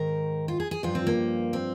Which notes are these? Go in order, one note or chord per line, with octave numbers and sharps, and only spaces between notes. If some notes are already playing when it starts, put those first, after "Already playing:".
Already playing: G#2 D#3 A#4
F4
G#4
G#4
G2 F3 F4
C4
A#3
C4